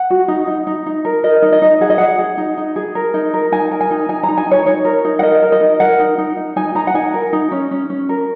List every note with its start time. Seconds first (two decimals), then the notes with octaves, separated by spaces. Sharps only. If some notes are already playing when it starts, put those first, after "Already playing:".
Already playing: F#5
0.10 F#4
0.28 D#4
0.47 D#4
0.67 D#4
0.86 D#4
1.05 A#4
1.24 A#4 D#5
1.42 D#4
1.52 D#5
1.62 D#4
1.81 G#4 F#5
1.90 D#5
1.98 G#4 F#5
2.19 G#4
2.37 D#4
2.58 D#4
2.76 G#4
2.95 A#4
3.14 D#4
3.34 A#4
3.52 D#4 G#5
3.71 A#4
3.81 G#5
3.91 D#4
4.09 D#4 G#5
4.23 A#5
4.28 D#4
4.38 G#5
4.47 D#4 C#5
4.66 D#4 C#5
4.85 A#4
5.05 D#4
5.19 F#5
5.23 A#4 D#5
5.42 A#4
5.52 D#5
5.61 D#4
5.80 A#4 F#5
5.99 D#4
6.18 D#4
6.37 D#4
6.56 D#4 G#5
6.75 D#4 A#5
6.87 F#5
6.94 D#4 G#5
7.14 A#4
7.33 D#4
7.52 C#4
7.71 C#4
7.90 C#4
8.09 A#4